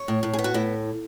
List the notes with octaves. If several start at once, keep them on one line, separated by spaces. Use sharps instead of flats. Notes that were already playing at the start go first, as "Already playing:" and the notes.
Already playing: C#5
A2
A2
G#4
B3
F#4
A2 E4